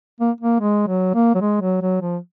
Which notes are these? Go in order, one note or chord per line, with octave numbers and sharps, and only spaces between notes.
A#3
A#3
G#3
F#3
A#3
F#3
G#3
F#3
F#3
F3